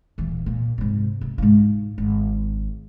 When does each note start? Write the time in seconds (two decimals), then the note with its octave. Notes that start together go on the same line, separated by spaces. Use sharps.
0.18 D#1 E3
0.46 A#2
0.78 G#2 C3
1.21 C3
1.38 G#2 F4
1.98 G#1